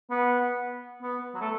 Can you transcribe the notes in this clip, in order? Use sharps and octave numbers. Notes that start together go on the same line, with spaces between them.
B3
B3
F#3
A3